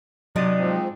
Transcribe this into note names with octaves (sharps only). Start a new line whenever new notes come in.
C3 F#3 B3 D4 D#4 D5 D#5
G#2 F3 C4